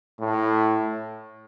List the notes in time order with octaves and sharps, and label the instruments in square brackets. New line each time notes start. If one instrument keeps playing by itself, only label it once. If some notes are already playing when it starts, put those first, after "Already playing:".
[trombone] A2